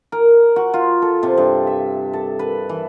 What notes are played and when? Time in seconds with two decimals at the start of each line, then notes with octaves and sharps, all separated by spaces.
0.12 A#4
0.56 F#4
0.74 F4
1.02 A4
1.23 C3
1.37 G2
1.67 E5
2.13 A4
2.39 B4
2.69 E3